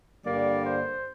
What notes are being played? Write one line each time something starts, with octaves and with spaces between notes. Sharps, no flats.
G2 D3 G3 A#3 D5
C5